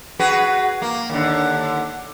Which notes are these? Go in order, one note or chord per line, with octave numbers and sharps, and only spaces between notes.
F#4 G#4 B4
A#3
D#2 D3